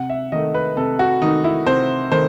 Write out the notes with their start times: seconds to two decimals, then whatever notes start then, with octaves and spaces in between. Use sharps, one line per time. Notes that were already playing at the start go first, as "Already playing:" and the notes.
Already playing: C3 F#5
0.10 E5
0.32 D#3 A3 D#5
0.54 B4
0.77 C3 A4
0.99 F#4
1.22 D#3 A3 D#4
1.44 E4
1.67 C3 C5
2.12 D#3 A3 C5